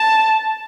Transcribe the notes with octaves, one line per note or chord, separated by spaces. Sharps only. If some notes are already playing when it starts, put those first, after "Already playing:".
Already playing: A5